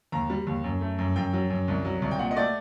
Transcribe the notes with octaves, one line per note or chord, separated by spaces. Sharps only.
D#2 A#5
G3
D#2
F#2
A3
F#2
F#2 G5
F#3
F#2
C2
F#3
C2
G5
A#2 F#5
D#5
A3 D5